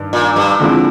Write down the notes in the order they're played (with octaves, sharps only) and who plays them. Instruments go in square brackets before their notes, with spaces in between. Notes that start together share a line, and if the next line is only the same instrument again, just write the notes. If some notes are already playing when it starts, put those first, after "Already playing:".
Already playing: [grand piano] G2 D#3 G3
[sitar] A#2
G2
[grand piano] D3 F3 G#3 C4 E4